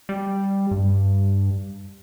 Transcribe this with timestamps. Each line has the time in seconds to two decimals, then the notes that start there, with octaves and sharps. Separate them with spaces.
0.09 G3
0.71 G2